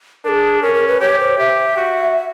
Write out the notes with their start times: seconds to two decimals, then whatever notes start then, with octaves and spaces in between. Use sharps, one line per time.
0.24 D4 G#4 A#4
0.62 C#4 A#4
0.75 A#4
0.88 B4
1.00 G4 C#5
1.20 C5
1.38 G4 E5
1.77 F#4